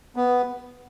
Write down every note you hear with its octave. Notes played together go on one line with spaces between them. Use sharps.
B3